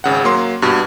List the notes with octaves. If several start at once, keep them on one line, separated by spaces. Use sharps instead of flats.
G#1 C#3 F#5
F#3 A#3 C6
G2 B2